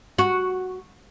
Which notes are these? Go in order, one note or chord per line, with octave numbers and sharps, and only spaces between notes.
F#4